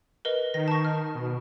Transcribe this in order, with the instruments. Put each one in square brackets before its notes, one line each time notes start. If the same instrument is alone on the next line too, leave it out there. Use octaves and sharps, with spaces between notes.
[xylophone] A#4 B4 D#5
[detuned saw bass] D#3 [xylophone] A#6
[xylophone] A5 C#6
F6
[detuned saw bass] B2